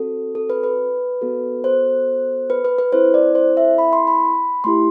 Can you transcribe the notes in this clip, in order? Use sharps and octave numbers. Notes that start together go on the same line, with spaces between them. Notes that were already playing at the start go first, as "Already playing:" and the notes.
Already playing: C4 F#4 A4
A4
B4
B4
B3 F#4 A4
C5
B4
B4
B4
C4 E4 A4 C5
D5
C5
E5
B5
C6
B5
A3 E4 G4 C6